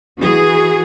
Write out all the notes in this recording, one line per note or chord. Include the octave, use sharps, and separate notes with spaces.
E3 F#4 G#4